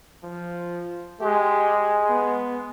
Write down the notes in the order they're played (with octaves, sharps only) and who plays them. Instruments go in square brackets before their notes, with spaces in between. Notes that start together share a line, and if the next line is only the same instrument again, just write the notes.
[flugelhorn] F3
[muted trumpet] G#3 [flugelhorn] G4
[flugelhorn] B3